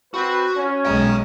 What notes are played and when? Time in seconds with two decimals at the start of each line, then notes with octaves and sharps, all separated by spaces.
0.14 C4 F#4 B4
0.56 C#4
0.85 B1 G#3 G5 A#5